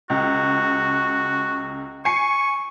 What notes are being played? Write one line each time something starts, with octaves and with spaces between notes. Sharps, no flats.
C#2 F#4
G#5 C#6 C7 C#7